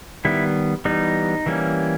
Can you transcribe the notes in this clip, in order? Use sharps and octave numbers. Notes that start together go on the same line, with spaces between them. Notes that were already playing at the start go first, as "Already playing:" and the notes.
D#3 G3 B3 E4
E3 G3 B3 D#4
E3 G3 A#3 C#4